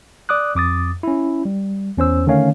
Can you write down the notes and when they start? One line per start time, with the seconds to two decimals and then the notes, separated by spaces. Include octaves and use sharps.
0.29 D5 D6 D#6 F#6
0.55 F2 D6 D#6 A6
1.03 C#4 E4
1.45 G3
1.97 E2 C#4 C5 E6
2.27 D3 D#3 A3 C#4 C#5 F5